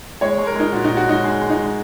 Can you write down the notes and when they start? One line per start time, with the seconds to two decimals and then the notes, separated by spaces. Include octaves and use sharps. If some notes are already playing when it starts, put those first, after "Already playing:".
0.21 G#3 C#5
0.38 G#3
0.47 A#4
0.56 G#3 D#4
0.72 A#2 F#4
0.84 A#2 D#4
0.97 F#4
1.07 G#3 D#4
1.24 G#3 G#4
1.41 G#3
1.50 D#4
1.58 G#3